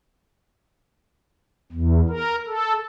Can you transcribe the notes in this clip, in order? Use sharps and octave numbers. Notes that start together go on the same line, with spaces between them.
E2
A#4
A4